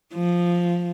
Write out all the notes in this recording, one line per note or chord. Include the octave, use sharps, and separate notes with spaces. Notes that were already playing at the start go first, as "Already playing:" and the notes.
F3